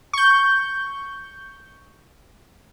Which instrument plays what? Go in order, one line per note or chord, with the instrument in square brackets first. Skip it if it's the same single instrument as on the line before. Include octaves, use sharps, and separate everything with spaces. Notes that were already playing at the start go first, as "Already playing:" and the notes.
[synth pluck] C#6 G6